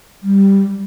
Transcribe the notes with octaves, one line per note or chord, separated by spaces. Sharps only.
G3